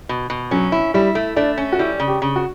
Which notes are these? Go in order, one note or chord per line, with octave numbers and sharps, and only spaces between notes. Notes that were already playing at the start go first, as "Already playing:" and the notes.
B2
B2
F#3 C#4
E4
G3 E4
A3
A3 D4
C#4
F#4
G3 E4
C#3
G4
C#3
F#4